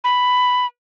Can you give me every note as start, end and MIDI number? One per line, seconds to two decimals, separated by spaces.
0.04 0.66 83